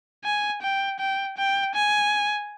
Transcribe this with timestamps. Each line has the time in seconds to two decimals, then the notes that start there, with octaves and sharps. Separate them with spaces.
0.24 G#5
0.62 G5
0.99 G5
1.38 G5
1.75 G#5